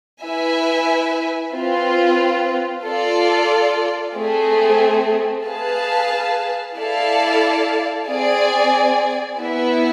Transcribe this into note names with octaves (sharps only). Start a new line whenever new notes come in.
E4 B4 E5 G#5
C4 F4 B4
F4 A4 D5
A3 C4 G#4
G#4 B4 F5 A5
E4 A4 D5 F5 A5
C4 G#4 D5 G#5
B3 E4 B4 E5